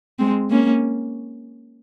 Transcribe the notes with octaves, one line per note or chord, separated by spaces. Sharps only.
G#3 C4
A#3 C#4